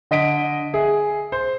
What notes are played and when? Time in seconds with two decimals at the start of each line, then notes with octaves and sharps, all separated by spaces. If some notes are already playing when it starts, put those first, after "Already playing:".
0.11 D3 D#5 B6 D7
0.73 G#4 E5
1.32 C5